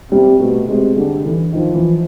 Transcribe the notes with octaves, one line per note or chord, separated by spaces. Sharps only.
C3 G3
B2 A3
C3 G#3
D3 G3
E3
D#3 F3
E3